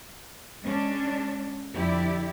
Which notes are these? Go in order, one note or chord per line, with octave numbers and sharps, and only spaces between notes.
G#3 C#4 D4
F2 D3 E4 G4 D5